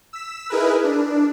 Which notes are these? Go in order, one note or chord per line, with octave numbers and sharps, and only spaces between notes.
E6 B6 E7
D#4 E4 G#4 A#4 B4
D4